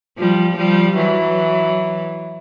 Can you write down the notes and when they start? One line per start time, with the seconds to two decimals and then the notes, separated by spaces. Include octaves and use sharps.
0.18 F3 G3
0.57 F3 G3
0.96 E3 F#3